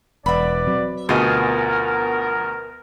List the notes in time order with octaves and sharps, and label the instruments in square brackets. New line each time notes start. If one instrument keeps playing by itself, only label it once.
[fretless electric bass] E1 [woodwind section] B3 B4 D5 [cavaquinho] E5 B5
[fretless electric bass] F#3 C4
[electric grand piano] D2 B2 [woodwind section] B3 A#4 [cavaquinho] F4 G#4 D#5